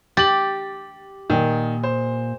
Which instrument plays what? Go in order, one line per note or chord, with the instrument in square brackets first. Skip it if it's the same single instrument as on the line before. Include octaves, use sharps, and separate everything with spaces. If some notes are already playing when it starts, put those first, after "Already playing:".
[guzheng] G4 [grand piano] A6 F#7
[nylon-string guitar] A#2 D#5 [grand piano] D#3
[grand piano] C5